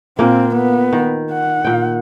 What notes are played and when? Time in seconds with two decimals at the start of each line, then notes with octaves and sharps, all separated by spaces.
0.19 A#2 A#3 C4
0.55 B3
0.93 D#3
1.32 F#5
1.65 A#2 G5